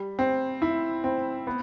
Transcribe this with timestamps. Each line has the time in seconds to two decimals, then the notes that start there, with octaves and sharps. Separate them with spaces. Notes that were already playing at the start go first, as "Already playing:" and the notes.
Already playing: G3
0.19 C4
0.62 E4
1.04 C4
1.47 B3